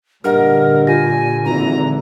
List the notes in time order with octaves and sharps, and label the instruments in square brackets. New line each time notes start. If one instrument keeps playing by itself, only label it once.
[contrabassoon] G2 [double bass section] A#2 D3 [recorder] A#4 [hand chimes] D#5 F#5 F6
[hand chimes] F4 G4 A#6 [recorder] G#5
[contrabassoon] G#1 [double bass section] A#2 D3 E3 [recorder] A#5